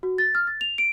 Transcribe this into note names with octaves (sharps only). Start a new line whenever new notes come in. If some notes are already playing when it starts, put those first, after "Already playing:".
F#4
A6
F6
A6
F7
D7